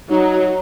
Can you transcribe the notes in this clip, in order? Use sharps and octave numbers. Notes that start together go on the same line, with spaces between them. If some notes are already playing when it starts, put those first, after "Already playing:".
F#3 D#4